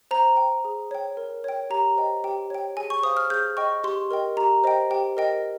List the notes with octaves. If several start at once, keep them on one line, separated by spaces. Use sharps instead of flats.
C5 A#5
G5
G#4
C#5 G5
A#4
C#5 G5
G4 A#5
C5 D#5 G5
G4 G5
C#5 G5
G#4 G#5
C#6
C5 F5 D#6
F6
G#4 G6
D#5 G5 C#6
G4 C6
A#4 D#5 G5
G4 A#5
C5 D#5 G5
G4 G5
A#4 D#5 G5